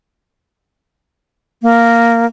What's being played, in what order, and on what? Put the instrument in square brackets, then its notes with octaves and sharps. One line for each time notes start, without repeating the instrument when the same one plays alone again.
[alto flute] A#3